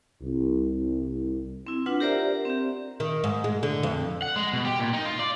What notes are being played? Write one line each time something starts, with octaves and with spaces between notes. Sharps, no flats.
C2
C4 E4
D4 F4 B4 F#5
G4 A#4 C5 D5 E5 A#5
C4 G4
D#3
G#2
G#3
D3
F2
F#5
G#3
B2
G4
A#2
D#4
F4
D5